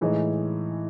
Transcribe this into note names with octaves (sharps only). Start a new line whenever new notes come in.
A2 E3 G#3 D#4